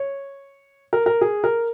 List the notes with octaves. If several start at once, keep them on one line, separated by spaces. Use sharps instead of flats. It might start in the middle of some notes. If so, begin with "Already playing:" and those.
Already playing: C#5
A#4
A#4
G#4
A#4